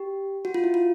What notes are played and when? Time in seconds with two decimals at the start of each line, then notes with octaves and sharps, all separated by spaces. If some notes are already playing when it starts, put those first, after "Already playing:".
Already playing: G4
0.45 F#4
0.54 F4
0.64 E4
0.74 F4